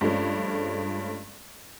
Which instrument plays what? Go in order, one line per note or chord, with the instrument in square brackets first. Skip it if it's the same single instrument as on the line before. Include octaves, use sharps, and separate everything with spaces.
[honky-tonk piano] G2 F3 G#3 A3 C#4